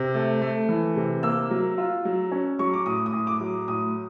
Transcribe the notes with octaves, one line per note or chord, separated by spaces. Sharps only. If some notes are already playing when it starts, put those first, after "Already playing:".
Already playing: C3
A3
A3
E3
C3
A#3 E6
F#3
F4
F#3
C#4
F#3 C#6
D6
A2 D#6
D#6
A2
D6
F#3
A2 D#6